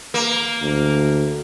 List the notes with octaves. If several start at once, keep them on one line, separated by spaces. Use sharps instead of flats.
A#3
D2